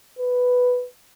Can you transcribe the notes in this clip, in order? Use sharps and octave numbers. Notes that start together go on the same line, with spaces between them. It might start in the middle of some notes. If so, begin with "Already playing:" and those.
B4